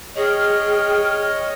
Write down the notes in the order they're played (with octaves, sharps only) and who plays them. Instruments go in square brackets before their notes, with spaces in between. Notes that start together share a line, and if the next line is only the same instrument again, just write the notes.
[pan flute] G#4 [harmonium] C#5 D#5 [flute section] G5 F6